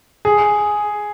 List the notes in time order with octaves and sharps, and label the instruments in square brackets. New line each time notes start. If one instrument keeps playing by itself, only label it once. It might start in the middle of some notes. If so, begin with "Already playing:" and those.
[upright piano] G#4